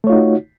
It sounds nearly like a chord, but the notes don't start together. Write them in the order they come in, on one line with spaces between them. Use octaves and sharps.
A3 C#5 F4 D#4 F#4